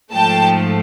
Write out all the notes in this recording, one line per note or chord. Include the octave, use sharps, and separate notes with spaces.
G#2 F3 A3 G5 A5